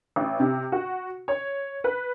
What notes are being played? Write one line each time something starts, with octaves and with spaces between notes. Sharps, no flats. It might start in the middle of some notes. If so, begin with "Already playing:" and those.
A1
C3
F#4
C#5
B4